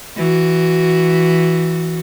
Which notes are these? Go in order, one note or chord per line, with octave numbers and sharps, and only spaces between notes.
E3 F#4